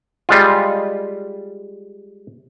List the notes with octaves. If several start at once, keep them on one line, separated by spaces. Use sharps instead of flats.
G3 G#3 F4